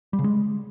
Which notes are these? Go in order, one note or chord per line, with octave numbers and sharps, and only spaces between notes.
G3
C#3
G#3